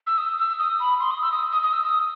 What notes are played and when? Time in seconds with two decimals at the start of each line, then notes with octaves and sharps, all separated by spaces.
0.07 E6
0.18 D#6
0.38 E6
0.59 D#6
0.80 B5
1.00 C6
1.11 D#6
1.22 E6
1.32 D#6
1.52 D#6
1.63 D#6
1.73 E6
1.84 D#6